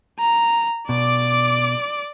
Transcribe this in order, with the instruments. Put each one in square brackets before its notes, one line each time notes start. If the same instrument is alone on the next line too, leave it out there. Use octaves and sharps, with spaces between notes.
[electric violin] A#5
[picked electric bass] B2 [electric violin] D5 D6